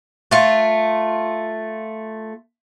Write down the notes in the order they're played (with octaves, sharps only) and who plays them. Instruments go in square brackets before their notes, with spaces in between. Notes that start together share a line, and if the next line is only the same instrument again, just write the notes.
[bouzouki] A3 F4